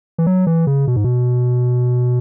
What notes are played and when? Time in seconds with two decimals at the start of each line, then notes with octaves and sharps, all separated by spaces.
0.18 E3
0.26 F#3
0.47 E3
0.67 C#3
0.88 B2
0.96 G#2
1.04 B2